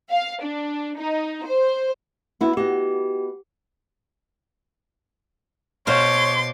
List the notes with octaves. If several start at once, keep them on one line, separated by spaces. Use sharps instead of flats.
F5
D4
D#4
C5
B3 E4 F#4
B3 F#4 G4 D#5
B2 C5 C#5 F5 C6 D6